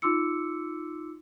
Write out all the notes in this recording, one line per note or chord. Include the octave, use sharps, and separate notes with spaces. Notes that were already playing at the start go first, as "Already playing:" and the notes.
D#4 F4 C6 D6 E6 C#7